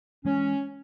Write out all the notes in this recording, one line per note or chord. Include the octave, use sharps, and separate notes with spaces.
E3 G#3 C#4